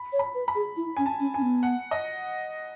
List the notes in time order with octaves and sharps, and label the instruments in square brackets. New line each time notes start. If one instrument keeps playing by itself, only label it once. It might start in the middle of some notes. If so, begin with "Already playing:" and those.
Already playing: [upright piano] B5
[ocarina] C#5
[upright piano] B5
[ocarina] B4
[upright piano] B5
[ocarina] G#4
E4
[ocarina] C#4 [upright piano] G#5
[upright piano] A5
[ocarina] C#4
[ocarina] C#4 [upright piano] G#5
[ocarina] B3
[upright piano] F#5
D#5